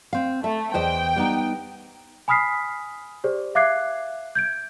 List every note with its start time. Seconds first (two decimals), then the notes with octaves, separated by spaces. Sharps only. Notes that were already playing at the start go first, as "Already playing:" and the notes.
0.13 C4 F5
0.44 A3 E5
0.74 E2 C5 D#5 G5
1.16 G3 B3 D#4
2.28 G#5 B5 D#6 F6 B6 C7
3.24 G4 G#4 C5 D5
3.55 E5 F5 D6 F#6 G#6 C7
4.35 G6 G#6 D7